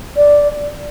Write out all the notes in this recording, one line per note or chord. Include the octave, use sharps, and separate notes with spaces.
D5